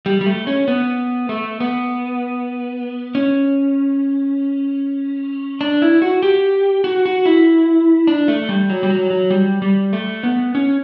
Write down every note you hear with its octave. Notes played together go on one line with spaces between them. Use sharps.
G3
G3
A3
C#4
B3
A3
B3
C#4
D4
E4
F#4
G4
F#4
F#4
E4
D4
A3
G3
F#3
G3
F#3
F#3
G3
G3
A3
B3
C#4